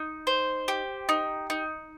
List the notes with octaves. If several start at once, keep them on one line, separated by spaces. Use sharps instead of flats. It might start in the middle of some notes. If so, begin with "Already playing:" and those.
Already playing: D#4
C5
G4
D#4
D#4